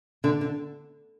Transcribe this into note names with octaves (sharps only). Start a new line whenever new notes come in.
D3
D3